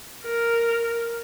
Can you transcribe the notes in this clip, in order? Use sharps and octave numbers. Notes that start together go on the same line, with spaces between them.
A#4